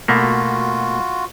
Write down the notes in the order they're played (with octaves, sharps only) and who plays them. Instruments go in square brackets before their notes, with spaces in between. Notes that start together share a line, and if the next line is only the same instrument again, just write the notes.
[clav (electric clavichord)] B2 A3 A#3 [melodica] F4 F#4